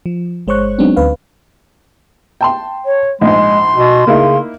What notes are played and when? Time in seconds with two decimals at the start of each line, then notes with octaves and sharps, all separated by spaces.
0.06 F3
0.47 G1 G#3 C5 C#5 C#6 F#6
0.78 F#3 G#3 B3 C4 D4 D#4
0.96 D2 B4 F5
2.41 G5 A5 C6
2.86 C#5
3.21 A#1 G#2 G#3 C6
3.75 B2
4.07 C#3 A#3 D#4 E4